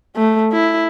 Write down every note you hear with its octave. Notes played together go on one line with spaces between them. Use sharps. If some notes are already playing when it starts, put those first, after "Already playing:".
A3
E4